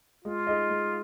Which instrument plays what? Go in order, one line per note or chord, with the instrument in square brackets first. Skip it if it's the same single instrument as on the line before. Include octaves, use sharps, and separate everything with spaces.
[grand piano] G#3 [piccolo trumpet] F4
[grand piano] D#4 G#4 D#5
G#3